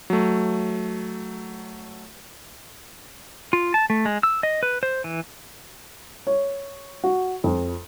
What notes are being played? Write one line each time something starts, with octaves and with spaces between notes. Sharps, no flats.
F#3 A3
F4
A5
A3
G#3
E6
D#5
B4
C5
E3
C#5
F#4
F2